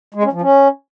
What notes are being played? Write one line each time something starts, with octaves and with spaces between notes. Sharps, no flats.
G#3
C#4
F3
C#4